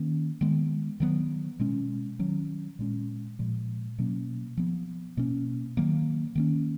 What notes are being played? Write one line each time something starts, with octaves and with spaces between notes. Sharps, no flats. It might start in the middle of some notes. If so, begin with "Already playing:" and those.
Already playing: D#3 A#3 C#4
D#3 G#3 B3
D#3 F#3 B3
B2 G#3 C#4
D#3 F#3 C#4
A#2 G#3 C#4
A#2 F3 G#3
B2 F#3 A#3 C#4
F3 B3
B2 A#3 C#4
D#3 F#3 A#3
D#3 A#3 C#4